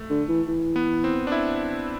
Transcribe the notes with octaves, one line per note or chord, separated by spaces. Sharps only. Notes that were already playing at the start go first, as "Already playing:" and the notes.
Already playing: A3
D3
E3
E3
B3
C4
D4
E4